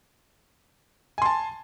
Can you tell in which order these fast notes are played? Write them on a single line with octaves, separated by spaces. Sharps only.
G#5 C6 A5